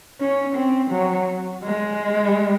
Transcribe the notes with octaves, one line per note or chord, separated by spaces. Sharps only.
C#4
C4
F#3
G#3